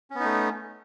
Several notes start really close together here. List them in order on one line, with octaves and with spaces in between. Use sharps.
C#4 B3 D#4 A3